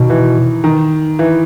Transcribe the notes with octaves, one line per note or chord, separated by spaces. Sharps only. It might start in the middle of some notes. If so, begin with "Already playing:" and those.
Already playing: B2 D#3
E3
D#3
E3